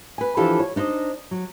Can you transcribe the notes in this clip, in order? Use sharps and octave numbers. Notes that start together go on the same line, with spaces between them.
B4 G#5
E3 F3 D4 F4 G4 A4
C#5
D4 D#4 C5 D#5
F#3